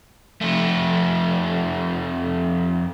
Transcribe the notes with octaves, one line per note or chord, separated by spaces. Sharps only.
F2 A3